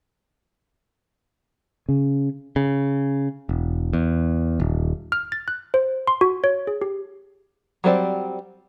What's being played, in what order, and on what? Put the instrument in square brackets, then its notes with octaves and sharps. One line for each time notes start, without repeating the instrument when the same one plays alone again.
[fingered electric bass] C#3
[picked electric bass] C#3
E1
E2
D#1
[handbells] F6
A6
F#6
C5
C6
F#4
C#5
G#4
G4
[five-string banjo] F#3 G3 C4 D5